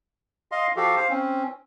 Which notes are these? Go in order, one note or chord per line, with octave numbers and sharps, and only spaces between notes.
D#5 F5 C6
F3 F#4 G4 A4 F5
C5 F5
C4 C#4